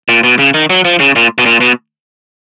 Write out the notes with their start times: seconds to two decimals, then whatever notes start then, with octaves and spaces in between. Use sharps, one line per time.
0.09 A#2
0.23 B2
0.39 C#3
0.54 D#3
0.70 F#3
0.85 F3
1.00 C#3
1.16 A#2
1.38 B2
1.46 A#2
1.61 B2